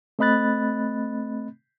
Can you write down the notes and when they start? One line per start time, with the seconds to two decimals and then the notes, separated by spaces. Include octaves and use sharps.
0.19 A3 C4 D#5 B5 F#6 A6